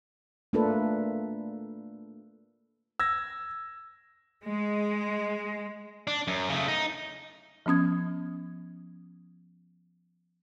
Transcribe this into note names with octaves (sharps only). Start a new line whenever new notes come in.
A3 A#3 D4 F4 A4 B4
E6 G#6 A#6
G#3
D4
F#2
C#3 A3
D#4
F3 B3 C#4 D#6 G#6